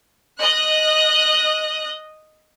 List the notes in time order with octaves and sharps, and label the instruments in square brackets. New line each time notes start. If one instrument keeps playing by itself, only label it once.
[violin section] D#5 F#6